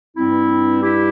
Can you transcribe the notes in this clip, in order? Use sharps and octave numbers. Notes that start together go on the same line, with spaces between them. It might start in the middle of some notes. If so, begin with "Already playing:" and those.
G2 G3 C4 E4
E4 G4